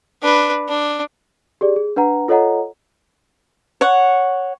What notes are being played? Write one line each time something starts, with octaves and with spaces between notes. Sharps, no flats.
D4 B4
D4
G4 G#4 D5
G#4
D4 B4 F#5 A#5
F4 A4 C#5 D#5 F#5 A#5
C#5 F#5